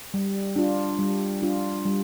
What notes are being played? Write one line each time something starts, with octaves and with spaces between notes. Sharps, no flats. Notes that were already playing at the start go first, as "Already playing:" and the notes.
G3
D4 F4
G3
D4 F4
G3